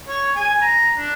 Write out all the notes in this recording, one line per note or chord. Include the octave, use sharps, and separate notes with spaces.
C#5
G#5
A#5
D4